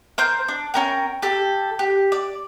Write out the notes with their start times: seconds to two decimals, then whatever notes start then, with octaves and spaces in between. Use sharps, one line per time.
0.18 A#4 C5 G6
0.48 D4
0.74 C#4 A#4 G5
1.22 G4 A4
1.79 G4
2.12 D5